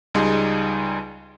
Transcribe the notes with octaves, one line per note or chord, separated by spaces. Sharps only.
C#2 G3 D#4 G#4 C6